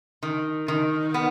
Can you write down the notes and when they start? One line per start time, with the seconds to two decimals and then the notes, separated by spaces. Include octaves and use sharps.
0.23 D#3
0.68 D#3
1.14 B3